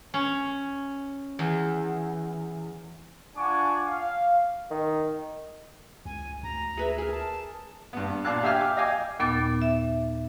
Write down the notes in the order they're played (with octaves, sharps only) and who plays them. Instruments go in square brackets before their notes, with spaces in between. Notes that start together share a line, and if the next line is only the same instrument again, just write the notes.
[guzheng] C#4
E2
[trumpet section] D4 F4 F#5 G#5 C#6 D6
F5
[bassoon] D#3
[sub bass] C#2 [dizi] G#5
[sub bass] D2 [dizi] A#5
[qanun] G#4 B4 E5
G#4 A#4
[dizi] A5
[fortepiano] G2 B3
A#2 D4 F5 A5 D6 F#6
G4 E5 F5 G5 G#5 F6
D6
D#5 F5 G5 G#5 D6
[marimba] D#2 A#2 B3 D6 A6
E5